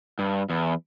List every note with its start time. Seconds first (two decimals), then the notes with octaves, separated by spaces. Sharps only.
0.19 G2
0.50 E2